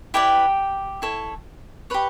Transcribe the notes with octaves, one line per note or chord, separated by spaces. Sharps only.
E4 G4 B4 D5 G5
E4 A4 C#5
G4 B4 C#5 B5